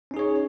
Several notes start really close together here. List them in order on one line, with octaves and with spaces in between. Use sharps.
C#4 D#4 G#4 C#5